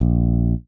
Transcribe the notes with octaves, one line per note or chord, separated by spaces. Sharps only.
A#1